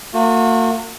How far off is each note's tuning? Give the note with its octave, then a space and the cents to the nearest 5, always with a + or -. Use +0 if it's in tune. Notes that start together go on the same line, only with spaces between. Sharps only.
A#3 -45 F#4 -40